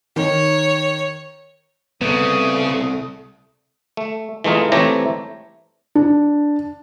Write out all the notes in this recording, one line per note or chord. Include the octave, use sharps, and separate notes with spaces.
D#3 C#5
C2 C#3 A3 B3 D#6
A3
E3 G#3 A3 D#4 F4
E3 A3 C4 G4 C#5 A#5
D4